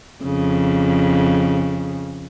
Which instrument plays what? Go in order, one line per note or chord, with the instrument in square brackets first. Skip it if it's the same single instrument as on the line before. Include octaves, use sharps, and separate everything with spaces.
[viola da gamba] F2 C#3